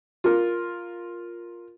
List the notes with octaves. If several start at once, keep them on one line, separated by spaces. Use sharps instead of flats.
F4 A#4